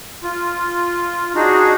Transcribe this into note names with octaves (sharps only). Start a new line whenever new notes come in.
F4
D4 D#4 F#4 G#4